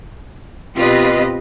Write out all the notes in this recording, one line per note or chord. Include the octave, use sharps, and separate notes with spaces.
B2 C4 F4 G4 B4 D#5